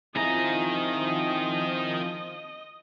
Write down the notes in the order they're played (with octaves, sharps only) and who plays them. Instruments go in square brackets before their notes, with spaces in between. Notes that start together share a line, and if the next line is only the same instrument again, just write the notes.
[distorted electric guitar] D#3 A#5 [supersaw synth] F3 [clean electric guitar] C4 E4 G#4 [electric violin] D#5